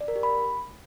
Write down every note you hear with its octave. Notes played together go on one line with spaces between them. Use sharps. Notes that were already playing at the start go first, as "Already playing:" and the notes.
D5
A#4
G4
B5